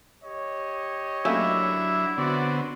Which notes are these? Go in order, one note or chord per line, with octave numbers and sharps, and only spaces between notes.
G4 C#5 D#5
F#3 A3 A#3 C#4 D4 E4 E5
D3 B3 C4 F#4 C#5 D5